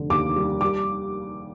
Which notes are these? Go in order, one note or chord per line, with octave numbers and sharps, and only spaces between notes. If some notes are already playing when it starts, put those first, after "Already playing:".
Already playing: F1 D3
D#2 D6
G3
G3 D6